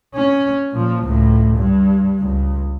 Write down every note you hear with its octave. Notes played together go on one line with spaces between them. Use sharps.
C#4
A#2 F3
C#2 A2
G2
C#2